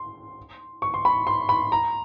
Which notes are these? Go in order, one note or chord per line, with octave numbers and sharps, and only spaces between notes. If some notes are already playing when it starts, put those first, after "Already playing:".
Already playing: C6
C#6
C6
B5
C6
B5
A#5